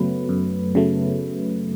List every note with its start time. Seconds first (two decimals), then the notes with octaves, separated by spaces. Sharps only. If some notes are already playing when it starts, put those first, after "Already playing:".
Already playing: F#2 C#3 F#3 A3 B3 B4
0.29 F#2
0.75 C#3 F#3 A3